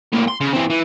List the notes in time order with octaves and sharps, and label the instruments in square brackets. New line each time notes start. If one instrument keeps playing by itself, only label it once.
[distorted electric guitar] A2 A#3
C6
C#3
E3 C4
E3